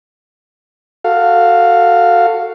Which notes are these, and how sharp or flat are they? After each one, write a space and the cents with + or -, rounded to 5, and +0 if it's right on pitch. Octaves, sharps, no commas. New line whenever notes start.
F#4 +0 A4 +25 F5 +0